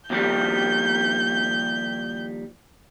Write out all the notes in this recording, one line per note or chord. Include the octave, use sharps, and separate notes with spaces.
D#2 F3 G3 G6